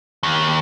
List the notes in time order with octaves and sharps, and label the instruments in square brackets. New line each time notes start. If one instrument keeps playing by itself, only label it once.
[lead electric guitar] D#2